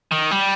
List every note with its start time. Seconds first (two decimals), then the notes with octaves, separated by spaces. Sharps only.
0.11 D#3
0.31 G3